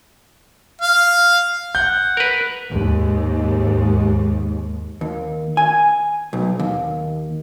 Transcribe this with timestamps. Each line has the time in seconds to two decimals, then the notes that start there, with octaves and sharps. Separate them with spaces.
0.82 F5
1.75 F#5 G6
2.17 A#4 B4
2.69 D#2 G#2
5.01 D#2
5.57 G#5
6.33 B1
6.59 D#2